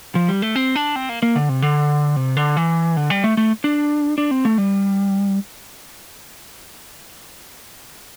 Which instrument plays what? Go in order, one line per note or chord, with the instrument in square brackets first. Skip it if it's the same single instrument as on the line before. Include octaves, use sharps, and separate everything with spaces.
[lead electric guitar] F3
G3
A3
C4
D4
C4
A#3
A#3
D3
C3
D3
C3
D3
E3
D3
G3
A3
A3
D4
D4
C4
A3
G3